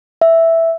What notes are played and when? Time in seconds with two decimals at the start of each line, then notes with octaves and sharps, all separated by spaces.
0.21 E5